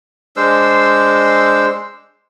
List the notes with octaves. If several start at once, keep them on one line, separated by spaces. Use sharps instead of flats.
G#3 D4 C5 E6